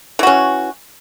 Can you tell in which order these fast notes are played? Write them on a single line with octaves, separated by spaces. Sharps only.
E3 F#4 C#4